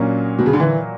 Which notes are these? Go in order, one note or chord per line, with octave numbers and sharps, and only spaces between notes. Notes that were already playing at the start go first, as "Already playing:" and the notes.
Already playing: A#2 F#3 A#3 C#4 D4
B2
C#3
D3
E3